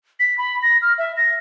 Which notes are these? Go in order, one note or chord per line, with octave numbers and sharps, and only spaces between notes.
B6
B5
A#6
F6
E5
A#6